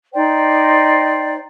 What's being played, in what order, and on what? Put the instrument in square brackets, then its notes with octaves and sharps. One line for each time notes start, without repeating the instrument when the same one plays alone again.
[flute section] D#4 C5 D5 G5